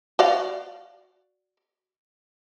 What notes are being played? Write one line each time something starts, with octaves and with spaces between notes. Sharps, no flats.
F#4 D5 F5